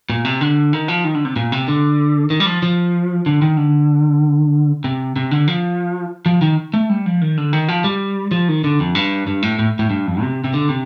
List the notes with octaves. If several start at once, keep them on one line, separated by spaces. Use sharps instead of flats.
A#2
C3
D3
D#3
F3
D#3
D3
C3
A#2
C3
D3
D#3
G3
F3
F3
D3
D#3
D3
C3
C3
D3
F3
F3
D#3
A3
G3
F3
D#3
D3
D#3
F3
G3
F3
D#3
D3
F2
G2
G2
A2
A2
A2
G2
F2
C3
C3
D3
C3